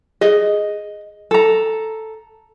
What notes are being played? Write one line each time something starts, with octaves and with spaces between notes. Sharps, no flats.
G#4 D#5
A4 A#5